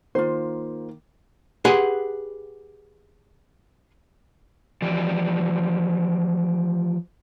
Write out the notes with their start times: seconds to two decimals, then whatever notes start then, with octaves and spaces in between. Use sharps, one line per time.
0.15 D#3 A#3 F4 C5
1.65 G4 G#4 B4 F#5 G#5 C6
4.82 E3 F3 G4 D5